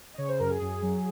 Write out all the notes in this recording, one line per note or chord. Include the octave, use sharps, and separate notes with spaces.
D#5
C#3 C#5
C5
F#2 A#4
G#4
F#2
F#3